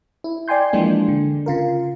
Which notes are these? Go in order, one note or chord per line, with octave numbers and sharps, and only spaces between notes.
E4
D5 G5 G#5 C6 G6
E3 F3 G#3 A#3 D4
D3
C#3 F4 A#4